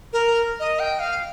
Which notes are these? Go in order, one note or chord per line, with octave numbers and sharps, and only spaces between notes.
A#4
D#5
G5
F5